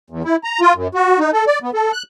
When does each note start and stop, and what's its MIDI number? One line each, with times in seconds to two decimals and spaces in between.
0.10 0.23 40
0.25 0.36 64
0.44 0.60 82
0.61 0.74 65
0.75 0.88 42
0.95 1.19 66
1.19 1.31 63
1.33 1.45 69
1.47 1.59 74
1.63 1.71 59
1.74 1.92 69
1.93 2.03 90